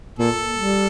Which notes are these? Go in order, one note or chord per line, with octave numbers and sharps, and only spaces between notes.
A#2 A4
G3